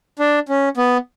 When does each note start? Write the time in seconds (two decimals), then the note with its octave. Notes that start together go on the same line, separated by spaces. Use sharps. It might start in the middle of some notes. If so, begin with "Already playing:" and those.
0.19 D4
0.49 C#4
0.77 B3